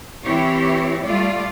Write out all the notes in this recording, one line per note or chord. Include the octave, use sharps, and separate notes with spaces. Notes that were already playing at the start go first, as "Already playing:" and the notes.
E3 C4 E4 G4 C#5
G3 A3 F4 D5